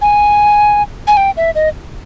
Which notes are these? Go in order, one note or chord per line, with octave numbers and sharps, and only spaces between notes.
G#5
G#5
G5
E5
D#5